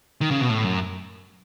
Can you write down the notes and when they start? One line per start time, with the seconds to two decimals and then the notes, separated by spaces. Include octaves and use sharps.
0.21 D#3
0.31 C#3
0.41 B2
0.50 A2
0.64 F#2